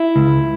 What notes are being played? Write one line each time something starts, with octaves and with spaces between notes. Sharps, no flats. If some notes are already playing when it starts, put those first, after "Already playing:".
Already playing: E4
C#2